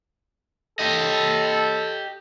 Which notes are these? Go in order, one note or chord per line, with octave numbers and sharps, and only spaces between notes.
G4 A4 D#5